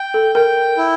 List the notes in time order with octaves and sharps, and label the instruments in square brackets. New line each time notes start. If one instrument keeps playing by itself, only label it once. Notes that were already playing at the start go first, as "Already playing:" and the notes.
Already playing: [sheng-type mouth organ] G5
[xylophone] A4
[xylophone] A#4 [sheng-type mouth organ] G5
[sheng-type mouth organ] E4